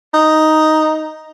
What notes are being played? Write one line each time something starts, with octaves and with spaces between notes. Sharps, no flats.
D#4